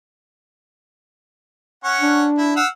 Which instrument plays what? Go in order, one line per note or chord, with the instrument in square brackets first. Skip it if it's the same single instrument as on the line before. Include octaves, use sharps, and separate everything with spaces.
[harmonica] C#4 F#5 C#6
[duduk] D4
[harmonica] E4
F5 F#5 E6